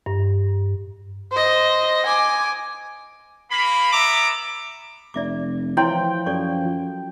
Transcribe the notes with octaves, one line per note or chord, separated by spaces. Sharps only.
G2
C5 D#5
G#5 D6
A#3 B5
B3 E5 A#5 D6
F1 D5 E5 D6
E3 F3 E4 C#5 G5 C6
F#2 A4 D5 C#6